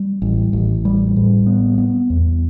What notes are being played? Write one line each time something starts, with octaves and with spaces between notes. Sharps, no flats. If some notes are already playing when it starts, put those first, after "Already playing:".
Already playing: G3
A1
A1
G3
A2
B3
B3
E2